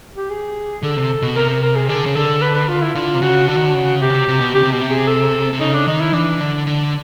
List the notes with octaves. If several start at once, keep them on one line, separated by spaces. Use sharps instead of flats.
G4
G#4
D3 A4
C3
B2
C3 A#4
A#4
A#4
G#4
D3 G#4
C#3
D3 A4
B4
B4
F4
E4
D3 F4
C3
C#3 F#4
D3 F#4
D#3
D3
C#3
C3 G4
C#3
C3
C3
B2
C#3 G4
C3
B2 G4
C3
G#4
A4
C3
C#3 D#4
D4
D#3 D#4
E4
E3 D4
D3
D3